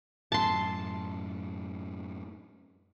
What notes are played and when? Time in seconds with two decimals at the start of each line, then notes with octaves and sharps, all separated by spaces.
0.32 F#2 A2 A5 C6